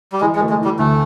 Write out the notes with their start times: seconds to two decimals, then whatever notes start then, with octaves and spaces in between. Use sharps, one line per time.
0.12 G3
0.21 E3 G#3
0.35 G#3
0.41 A3
0.50 G#3
0.60 E3 G3
0.79 D2 A3